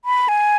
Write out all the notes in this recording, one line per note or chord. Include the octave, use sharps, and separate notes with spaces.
B5
G#5